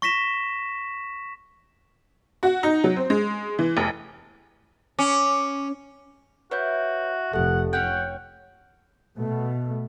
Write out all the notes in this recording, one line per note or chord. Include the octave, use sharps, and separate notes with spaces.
C#6 A#6 B6 E7
F#4
D#4
F#3
C4
G#3
E3
F1
C#4 D6
E4 F#4 B4 C#5 G6
F1 G4 A4 F#5
C#4 C#5 F#5 G5 G6
B2 A3